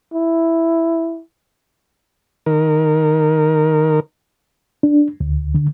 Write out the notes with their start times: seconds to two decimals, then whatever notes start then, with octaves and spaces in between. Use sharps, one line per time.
0.14 E4
2.46 D#3 A#4
4.83 D4
5.20 D2
5.55 D3